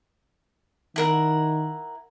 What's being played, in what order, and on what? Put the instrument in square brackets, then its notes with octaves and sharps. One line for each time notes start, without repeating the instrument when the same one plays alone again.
[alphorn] D#3 [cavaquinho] E4 A#4 F#5